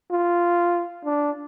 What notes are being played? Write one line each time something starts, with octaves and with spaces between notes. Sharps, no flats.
F4
D4